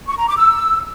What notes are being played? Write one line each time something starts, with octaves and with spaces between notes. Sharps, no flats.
C#6
A#5
D6
E6